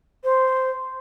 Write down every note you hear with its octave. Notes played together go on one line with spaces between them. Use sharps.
C5